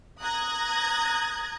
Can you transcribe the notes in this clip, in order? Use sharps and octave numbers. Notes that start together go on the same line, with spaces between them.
A#5 D#6 F#6 G#6 A#6